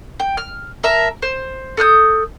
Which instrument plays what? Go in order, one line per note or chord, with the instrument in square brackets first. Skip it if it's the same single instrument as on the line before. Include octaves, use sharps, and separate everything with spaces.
[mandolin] G5
F6
A#4 E5 A5
C5
A4 D#6 F6 G6